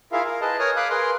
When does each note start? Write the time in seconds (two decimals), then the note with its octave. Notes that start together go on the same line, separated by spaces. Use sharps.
0.12 E4 F4 G#4 A#4 E5 F5
0.26 A#4
0.41 G#4 B4 D#5 A5
0.59 A#4 C#5 G#5 D#6 F6
0.77 F5 G#5 B5 D6 D#6 F#6
0.90 G#4 A#4 B4 C6